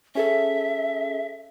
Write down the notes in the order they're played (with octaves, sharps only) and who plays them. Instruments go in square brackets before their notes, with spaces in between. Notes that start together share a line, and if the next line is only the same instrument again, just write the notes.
[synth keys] C#4 G#4 A4 [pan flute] E5